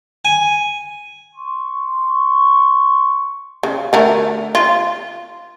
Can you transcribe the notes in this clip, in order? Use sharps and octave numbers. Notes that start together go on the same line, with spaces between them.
G#5
C6 C#6
C#3
D3 A3 A#4
F4